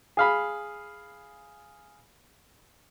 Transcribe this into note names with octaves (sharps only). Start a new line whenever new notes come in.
G#4 F5 B5